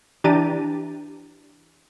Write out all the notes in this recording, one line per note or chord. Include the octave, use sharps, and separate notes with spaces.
E3 D4 G4 A#5 A6 D#7